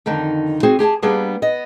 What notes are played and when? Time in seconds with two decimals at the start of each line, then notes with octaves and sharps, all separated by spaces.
0.06 F2 D3 D#3 D#4
0.63 C4 F#4 G#4
0.79 G4 G#4 G5 A5
1.02 G3 A#3 B3 D4 G#4
1.42 B3 D#5